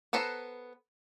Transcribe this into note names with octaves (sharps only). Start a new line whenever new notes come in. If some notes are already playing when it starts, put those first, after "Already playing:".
B3 A4 B4 C5 A#5